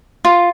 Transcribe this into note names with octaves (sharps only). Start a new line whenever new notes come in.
F4